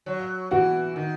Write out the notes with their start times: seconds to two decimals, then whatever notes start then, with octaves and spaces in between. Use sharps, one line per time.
0.06 F#3
0.51 E3 F#4
0.96 D#3